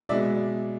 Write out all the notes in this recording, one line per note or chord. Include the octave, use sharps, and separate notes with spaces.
B2 G#3 B3 D5 E5